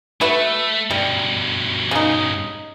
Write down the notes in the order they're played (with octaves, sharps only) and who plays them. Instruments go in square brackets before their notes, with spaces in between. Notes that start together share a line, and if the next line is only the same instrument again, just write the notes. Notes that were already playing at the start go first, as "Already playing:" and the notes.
[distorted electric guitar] A3 [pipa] F#4 B4 E5
[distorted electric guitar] G2 B2 [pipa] G3
[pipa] C#3 D#4